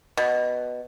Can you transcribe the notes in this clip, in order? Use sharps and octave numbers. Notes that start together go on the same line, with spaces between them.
B2